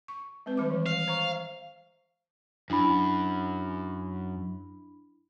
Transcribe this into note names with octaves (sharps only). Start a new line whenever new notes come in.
C#6
G#3 C4 B4
D#3 G3 D6
E3
F5
C5 A#5 C#6
F#2 D4 E4 B5